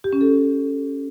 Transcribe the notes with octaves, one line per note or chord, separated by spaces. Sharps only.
G4
C#4
A4